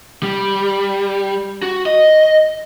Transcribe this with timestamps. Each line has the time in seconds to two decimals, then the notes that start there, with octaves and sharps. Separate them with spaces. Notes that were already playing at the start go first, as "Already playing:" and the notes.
0.23 G3
1.63 F#4
1.86 D#5